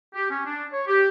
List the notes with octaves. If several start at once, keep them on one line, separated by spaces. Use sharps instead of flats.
G4
C#4
D4
C#5
G4